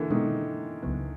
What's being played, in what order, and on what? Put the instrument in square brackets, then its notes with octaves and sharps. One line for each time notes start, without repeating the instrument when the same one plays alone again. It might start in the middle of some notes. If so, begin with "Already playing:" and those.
Already playing: [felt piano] D3 E3 A#3
[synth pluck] B2 G#3 B3 [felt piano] D#3
[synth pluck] C#2 C#3 F#3 B3